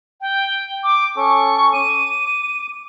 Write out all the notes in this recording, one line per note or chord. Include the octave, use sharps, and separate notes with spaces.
G5
D6
C#4 A4 C#6
D6 D#7